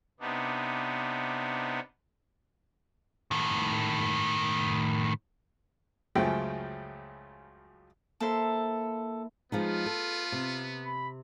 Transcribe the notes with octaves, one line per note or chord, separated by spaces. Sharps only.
C3 B3 D4 D#4
A2 D#3
C#2 F#2 C#3 F3 A3 G5
A#3 E4 A4 C5
F3 G#3 B3 D#4 F4
A4
C3
B5